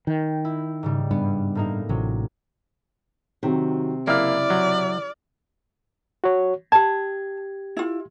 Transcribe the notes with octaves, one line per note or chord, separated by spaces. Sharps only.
D#3 G5
E4
G#2 C#3 G3
G2 B3
A2 A#3 D#4
A1 C3 F#3
C3 D#3 F#3
F#1 A#3 E4 D5 F6
F#3
F#4 C#5
G4 A5 G#6
E4 F4